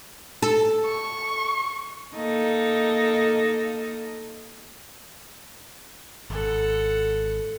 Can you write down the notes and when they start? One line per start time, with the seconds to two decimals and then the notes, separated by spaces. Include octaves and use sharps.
0.42 A4
0.85 C#6
2.15 A#3 D#4 A4
6.30 G#1 A4 F#5